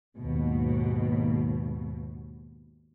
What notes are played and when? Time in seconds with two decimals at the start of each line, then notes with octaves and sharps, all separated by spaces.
0.18 D#2 G#2 B2